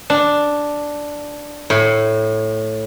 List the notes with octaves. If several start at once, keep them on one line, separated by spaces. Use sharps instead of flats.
D4
A2